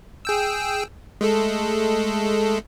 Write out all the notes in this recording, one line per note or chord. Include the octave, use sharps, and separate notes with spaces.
G#4 G5 E6
G#3 A3 A4